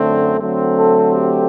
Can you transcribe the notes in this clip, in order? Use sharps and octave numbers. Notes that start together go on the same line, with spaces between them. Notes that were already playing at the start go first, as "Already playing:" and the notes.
Already playing: F#2 D3 A3 C4
D3 F#3 A3 C4
A4
G4